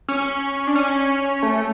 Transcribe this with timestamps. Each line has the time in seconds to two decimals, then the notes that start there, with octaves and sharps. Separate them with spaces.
0.09 C#4
0.67 D4
0.75 C#4
1.43 A3